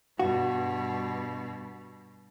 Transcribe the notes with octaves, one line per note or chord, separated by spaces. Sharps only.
G2 B2 F#4